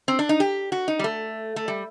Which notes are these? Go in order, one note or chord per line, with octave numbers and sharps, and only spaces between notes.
C4
D4
D#4
G4
F#4
D#4
G3
A3
A3
G3